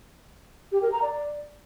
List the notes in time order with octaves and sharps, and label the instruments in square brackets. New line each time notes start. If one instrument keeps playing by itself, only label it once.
[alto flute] G4
A#4
A#5
D5